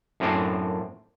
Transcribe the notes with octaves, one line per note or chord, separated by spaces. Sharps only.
F#2 A2 A#3 C4 D4